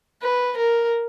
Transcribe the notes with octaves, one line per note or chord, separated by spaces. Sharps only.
B4
A#4